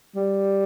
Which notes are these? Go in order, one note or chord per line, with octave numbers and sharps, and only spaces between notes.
G3